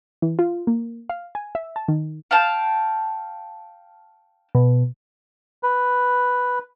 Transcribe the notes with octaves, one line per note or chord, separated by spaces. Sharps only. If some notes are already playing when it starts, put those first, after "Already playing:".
E3
F4
A#3
F5
G#5
E5
A5
D#3
F5 G5 A5
B2
B4